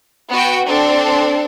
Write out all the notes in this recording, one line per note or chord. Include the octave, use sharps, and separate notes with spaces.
B3 F#4 G5
C4 D4 A4